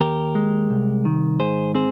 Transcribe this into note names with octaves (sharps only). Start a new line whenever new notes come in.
D#2 G4 A#4
G#3
C2
D#3
G#2 G#4 C5
C4 G#4 C5